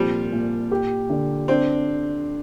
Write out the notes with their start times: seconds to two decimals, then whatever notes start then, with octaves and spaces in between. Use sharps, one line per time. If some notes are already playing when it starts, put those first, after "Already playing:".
Already playing: C2 A#2 F3 G3
0.32 A#2
0.71 G4
1.09 D3
1.48 C4 D4